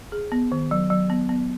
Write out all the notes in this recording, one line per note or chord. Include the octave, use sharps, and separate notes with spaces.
G#4
B3
D#3
F#3
F#3
B3
B3